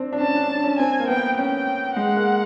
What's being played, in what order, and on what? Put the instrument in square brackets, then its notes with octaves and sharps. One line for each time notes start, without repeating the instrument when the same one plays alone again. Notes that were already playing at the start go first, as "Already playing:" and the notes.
Already playing: [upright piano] C4 D4
D4
[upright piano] C#4 [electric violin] A5
[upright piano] D4
D4
C#4
[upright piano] C4 [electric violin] G#5
[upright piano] A#3
[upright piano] B3 [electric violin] G5
[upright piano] C#4 [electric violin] G5
[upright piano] G#3 [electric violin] F#5
[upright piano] A#3